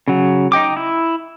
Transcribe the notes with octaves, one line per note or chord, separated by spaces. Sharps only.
C#3 F#3
D#4 D#5 G5 D6
E4